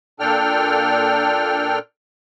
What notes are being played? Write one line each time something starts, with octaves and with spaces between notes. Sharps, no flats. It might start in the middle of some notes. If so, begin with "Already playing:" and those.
A#2 D4 A4 G5 F6